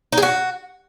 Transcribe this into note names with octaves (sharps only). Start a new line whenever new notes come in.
D#4
G#4
F#4